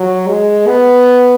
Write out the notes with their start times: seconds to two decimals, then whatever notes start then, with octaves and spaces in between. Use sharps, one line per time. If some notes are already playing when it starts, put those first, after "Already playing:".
Already playing: F#3
0.28 G#3
0.67 B3